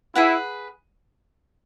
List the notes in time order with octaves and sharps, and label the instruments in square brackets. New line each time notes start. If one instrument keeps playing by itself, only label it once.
[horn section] E4 [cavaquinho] G#4 B4 F#5